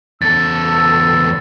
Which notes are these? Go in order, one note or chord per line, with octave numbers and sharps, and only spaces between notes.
E2 A4 E6 A6